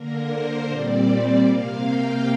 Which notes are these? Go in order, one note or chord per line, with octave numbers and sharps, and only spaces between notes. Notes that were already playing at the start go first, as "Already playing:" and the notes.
Already playing: D3 A#3 A#4
C5
A#2 G3 C4 D5
C3 A#3 F5
G5